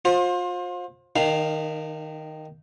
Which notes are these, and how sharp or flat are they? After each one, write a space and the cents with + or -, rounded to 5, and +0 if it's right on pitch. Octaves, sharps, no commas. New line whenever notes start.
F4 +35 C5 +25
D#3 +0 D#4 -45 F5 +0